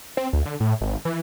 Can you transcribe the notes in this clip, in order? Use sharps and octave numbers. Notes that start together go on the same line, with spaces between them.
C4
D2
D3
A2
G#1
E3